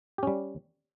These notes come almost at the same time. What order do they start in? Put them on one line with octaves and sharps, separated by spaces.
G4 C#4 G3